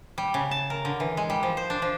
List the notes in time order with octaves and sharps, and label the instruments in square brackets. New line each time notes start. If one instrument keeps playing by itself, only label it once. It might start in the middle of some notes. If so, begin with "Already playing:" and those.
[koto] G3
C#3
A5
A#4
D3
E3
G#3
G3
F3
C5
D4
F3